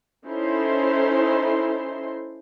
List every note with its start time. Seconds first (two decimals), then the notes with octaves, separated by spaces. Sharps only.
0.25 C#4 D#4 E4 A4 C5 C6